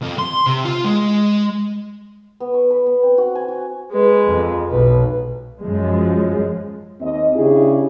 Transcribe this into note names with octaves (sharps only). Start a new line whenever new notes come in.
F2
C6
C3
F4
G#3
B3
C#6
B4
B3
C4
F#4
G#5
F#4
G#3 B4
F2
B1 B4
F#2 F3 G#3
D#2 C4 D#5
C#3 D4 E4 G4 G#4